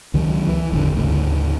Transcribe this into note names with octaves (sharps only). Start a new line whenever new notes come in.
C#2 D#3 F#3
E3
D#1 G#1 E2 D3
D2 G#2 C#3